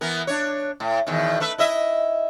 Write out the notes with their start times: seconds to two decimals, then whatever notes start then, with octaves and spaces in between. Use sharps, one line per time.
0.01 E3 B3 A#4
0.27 D4 C#5
0.80 A2
1.07 E2 B2 D#3
1.40 A3 B4 E5
1.58 E4 D#5 E5